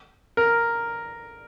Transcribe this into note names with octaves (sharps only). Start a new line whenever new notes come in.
A#4